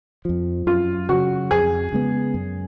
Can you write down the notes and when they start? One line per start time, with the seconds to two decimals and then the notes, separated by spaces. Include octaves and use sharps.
0.25 F2 F3
0.67 F#2 F4
1.09 C#3 F#3 F#4
1.51 F2 G#4
1.93 C#3 G#3 B3
2.34 F#2